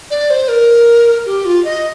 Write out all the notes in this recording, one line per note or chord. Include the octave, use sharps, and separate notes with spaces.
D5
C5
A#4
G4
F4
D#5